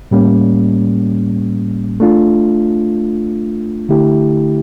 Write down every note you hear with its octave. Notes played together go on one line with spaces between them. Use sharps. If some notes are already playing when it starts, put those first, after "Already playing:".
A2 G3 A#3 C#4
A3 D4 F4
D3 A3 E4 G4